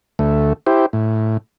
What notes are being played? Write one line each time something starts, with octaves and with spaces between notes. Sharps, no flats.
D2 A3
E4 G4 C5
A2